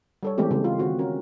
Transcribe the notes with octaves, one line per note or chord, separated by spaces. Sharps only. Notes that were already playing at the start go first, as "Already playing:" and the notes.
G3 A4 C#5
E3 G#3 A3 B3 C4 G4
C#3 G3 G#3 G4
F4
D#3 C4 F#4
C#4 F#4 A#4